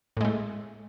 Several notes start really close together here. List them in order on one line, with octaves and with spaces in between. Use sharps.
A2 G#3 A3